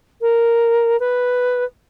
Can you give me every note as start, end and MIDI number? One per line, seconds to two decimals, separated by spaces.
0.21 0.99 70
0.99 1.64 71